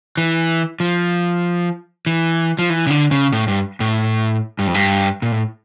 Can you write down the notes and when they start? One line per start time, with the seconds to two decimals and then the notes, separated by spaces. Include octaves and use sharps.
0.17 E3
0.80 F3
2.06 E3
2.59 F3
2.70 E3
2.87 C#3
2.90 D3
3.11 C#3
3.33 A2
3.48 G2
3.80 A2
4.59 G2
4.67 F2
4.74 G2
5.22 A#2
5.32 A2